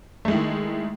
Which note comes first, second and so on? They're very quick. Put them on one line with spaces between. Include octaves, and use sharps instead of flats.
A3 G#3 E4 D#3